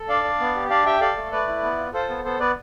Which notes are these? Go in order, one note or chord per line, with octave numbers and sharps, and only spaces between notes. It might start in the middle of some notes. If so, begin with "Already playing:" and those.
Already playing: A4
D4 D5 F5
D4
B3
G4
D4 D5 F5
G4 E5 G5
A4 D5 F5
A3
A3 B4 D5
E4
B3
F4
F4 A4 C5
B3
B3 A4 C5
B3 B4 D5